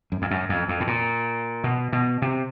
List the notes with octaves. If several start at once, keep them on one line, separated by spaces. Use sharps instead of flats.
F#2
F2
F#2
F2
F2
A2
A#2
B2
B2
C3